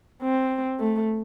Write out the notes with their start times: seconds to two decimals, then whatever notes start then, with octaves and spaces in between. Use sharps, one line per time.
0.22 C4
0.80 A3